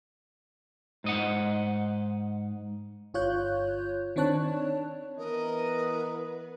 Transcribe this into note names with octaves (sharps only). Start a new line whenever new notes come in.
G#2 D#5 F#5
G1 F4 C#5 F#6 G6
D#3 C4 D4 C#5 A5 F#6
E3 B3 A#4 B4 D#5